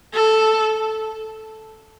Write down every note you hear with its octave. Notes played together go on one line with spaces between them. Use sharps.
A4